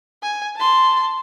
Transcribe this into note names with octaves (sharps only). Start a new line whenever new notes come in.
G#5
A5 C6